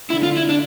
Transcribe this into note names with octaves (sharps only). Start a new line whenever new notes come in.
D3 E4
F4
E4
D4